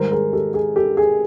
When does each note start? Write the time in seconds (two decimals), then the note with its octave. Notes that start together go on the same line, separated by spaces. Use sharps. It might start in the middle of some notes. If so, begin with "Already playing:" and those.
Already playing: G#2 D#3 G3 A#4 C5
0.11 G#4 A#4
0.33 G4 A4
0.54 G#4
0.76 G4 A4
0.97 G#4